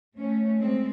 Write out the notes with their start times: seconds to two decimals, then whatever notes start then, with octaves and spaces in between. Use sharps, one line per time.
0.19 A3 C#4
0.61 G#3 C4